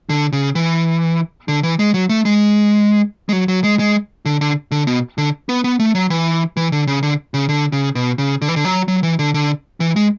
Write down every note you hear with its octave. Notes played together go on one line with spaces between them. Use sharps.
D3
C#3
E3
D3
E3
G#3
F#3
A3
G#3
G#3
F#3
F#3
G#3
G#3
D3
D3
D3
B2
D3
B3
B3
A3
F#3
E3
E3
D3
C#3
D3
C#3
D3
C#3
B2
C#3
D3
E3
D3
F#3
F#3
E3
D3
D3
E3
G#3